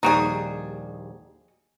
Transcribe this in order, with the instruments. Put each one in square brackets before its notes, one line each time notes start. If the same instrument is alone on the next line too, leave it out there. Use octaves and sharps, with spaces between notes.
[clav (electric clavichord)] A#1 D#2 G3 [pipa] D#4 F#4 G#4